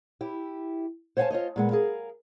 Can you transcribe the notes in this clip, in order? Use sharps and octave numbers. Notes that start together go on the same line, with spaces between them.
E4 G4
C5 C#5 F5 F#5 G#5 A5
F4 C5 C#5 D#5
A#2 G#3 B3
G#4 A#4 F5